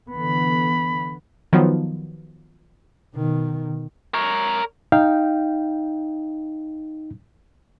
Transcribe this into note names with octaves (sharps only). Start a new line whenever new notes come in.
D3 E3 B3 B5
D#3 F3 F#3 B3
B2 D#3
A#4 C#5
D#4 F5 G5